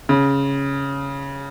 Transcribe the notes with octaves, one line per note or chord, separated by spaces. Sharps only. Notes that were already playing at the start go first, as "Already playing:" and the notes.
C#3